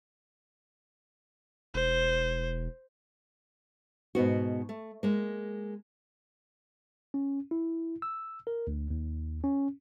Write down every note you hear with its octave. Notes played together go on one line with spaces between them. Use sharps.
E1 C5
G#2 B2 B3 F#4
A3
G#3 A#3
C#4
E4
E6
A#4
D2
D#2
C#4